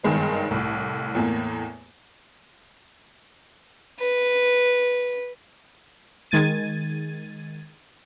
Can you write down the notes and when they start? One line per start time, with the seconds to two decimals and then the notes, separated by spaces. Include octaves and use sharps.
0.04 F#1 G2 D#3 G#3 B3
0.51 C2 A2
1.15 E2 A2 A#3
4.00 B4
6.31 D#3 G#3 G#6 A6 D#7